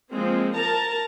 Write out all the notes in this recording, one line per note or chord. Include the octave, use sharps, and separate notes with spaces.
F3 G#3 A#3 C4
A#4 A5 A#5